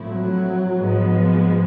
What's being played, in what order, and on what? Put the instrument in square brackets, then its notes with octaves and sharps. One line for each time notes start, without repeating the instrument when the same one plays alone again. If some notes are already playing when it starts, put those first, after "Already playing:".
Already playing: [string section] A2 F3 A3 C4 E4
[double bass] F#3
[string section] G#2 F3 G#3 B3